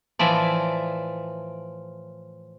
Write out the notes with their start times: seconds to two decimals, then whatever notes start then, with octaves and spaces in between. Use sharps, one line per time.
0.19 A2 E3 F3 D5